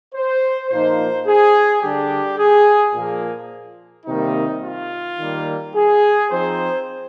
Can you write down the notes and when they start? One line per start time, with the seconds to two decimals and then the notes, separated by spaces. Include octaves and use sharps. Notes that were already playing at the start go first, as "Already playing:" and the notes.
0.14 C5
0.70 A#2 F3 A#3 D#4 C5
1.27 G#4
1.83 D3 G3 D4 G4
2.39 G#4
2.94 A#2 F3 A#3
4.06 C3 D#3 G3 A#3 D#4
4.62 F4
5.18 D#3 G3 A#3
5.75 G#4
6.30 F3 C4 D#4 C5